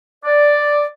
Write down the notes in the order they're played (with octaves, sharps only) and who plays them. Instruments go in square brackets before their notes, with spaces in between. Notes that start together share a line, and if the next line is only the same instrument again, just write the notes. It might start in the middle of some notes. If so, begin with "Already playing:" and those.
[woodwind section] D5